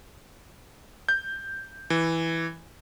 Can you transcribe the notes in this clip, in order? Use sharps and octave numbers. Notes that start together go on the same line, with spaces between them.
G6
E3